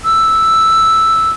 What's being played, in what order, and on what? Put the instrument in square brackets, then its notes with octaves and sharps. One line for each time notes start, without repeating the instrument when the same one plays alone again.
[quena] E6